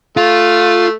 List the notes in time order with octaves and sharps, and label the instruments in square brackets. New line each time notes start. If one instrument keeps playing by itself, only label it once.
[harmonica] A3 [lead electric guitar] F4